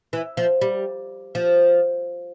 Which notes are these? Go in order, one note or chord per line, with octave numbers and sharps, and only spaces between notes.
E3
F3
G3
F3